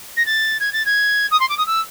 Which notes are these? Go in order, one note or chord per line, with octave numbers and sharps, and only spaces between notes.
A#6
A6
G#6
A6
G#6
D#6
C6
D6
D#6
E6